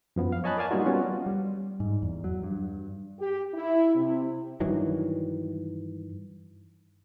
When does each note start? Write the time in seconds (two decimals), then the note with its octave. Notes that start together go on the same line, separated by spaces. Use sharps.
0.16 F#2 F3 B3
0.32 F5
0.44 C#5 D#5 G#5 A5 B5 F#6
0.57 A#4 D5 F5 G#5 A5
0.71 F#3 G3 A#3 D#4 F4 F#4
0.85 G3 B3 C#4 F4 F#4
1.26 G3
1.80 G#2
2.03 E2
2.24 F#3
2.43 G2
3.20 G4
3.54 E4
3.95 C3
4.60 G2 D#3 E3 F#3